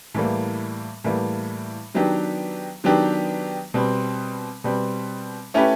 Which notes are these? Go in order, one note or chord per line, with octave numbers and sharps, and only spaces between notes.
A2 E3 G3 A#3
A2 E3 G3 A#3
D#3 F#3 B3 D4 G4
D#3 F#3 B3 D4 G4
B2 G3 C4
B2 G3 C4
A3 C#4 E4 G4 B4